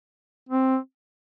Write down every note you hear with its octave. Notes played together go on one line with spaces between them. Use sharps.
C4